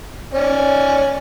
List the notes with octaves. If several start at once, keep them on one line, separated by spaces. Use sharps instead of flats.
C#4 D5 G#5